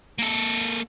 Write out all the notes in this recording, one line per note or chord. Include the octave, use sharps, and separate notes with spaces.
A#3 A4